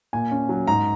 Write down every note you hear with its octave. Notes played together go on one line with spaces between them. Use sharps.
A#2 G#5
C#4
F#3
G#2 A#5